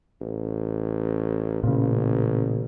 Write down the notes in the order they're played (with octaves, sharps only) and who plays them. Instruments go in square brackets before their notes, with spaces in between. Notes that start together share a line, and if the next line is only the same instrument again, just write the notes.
[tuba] A1
[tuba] A1 [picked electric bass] A#2 C#3